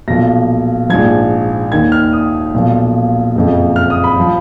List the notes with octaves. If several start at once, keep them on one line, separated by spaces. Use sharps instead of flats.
B1 A#2 F3 A#6
A#1 G#2 F3 G#6
D#2 D#3 G#6
F6
D#6
B1 A#2 F3
F#1 F2 F3
F6
D#6
B5
F3